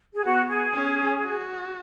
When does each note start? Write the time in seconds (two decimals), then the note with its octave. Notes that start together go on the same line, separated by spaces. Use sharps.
0.14 G#4
0.24 B3 F#4
0.50 G#4
0.73 C#4
1.22 F#4